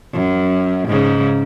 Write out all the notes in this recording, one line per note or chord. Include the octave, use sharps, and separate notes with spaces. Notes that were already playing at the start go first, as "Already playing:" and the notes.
F#2
G#2 C#3